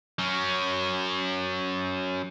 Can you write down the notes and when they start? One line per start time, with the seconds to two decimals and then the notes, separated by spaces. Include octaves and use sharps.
0.19 F#3 C#4